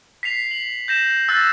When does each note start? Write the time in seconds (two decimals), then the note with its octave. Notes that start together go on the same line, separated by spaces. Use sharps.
0.23 B6 C7 F7
0.51 F#7
0.88 G6 A#6 E7
1.29 E6 F#6 A6 A#6